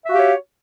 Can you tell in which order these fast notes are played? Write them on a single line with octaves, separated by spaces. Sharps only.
E5 F#4 F5 G4 C#5